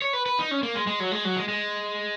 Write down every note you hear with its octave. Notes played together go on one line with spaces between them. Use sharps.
C#5
B4
B4
D#4
C#4
A#3
G#3
G#3
F#3
G#3
F#3
G#3
G#3